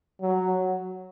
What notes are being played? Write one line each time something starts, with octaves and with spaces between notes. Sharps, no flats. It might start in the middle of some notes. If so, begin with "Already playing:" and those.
F#3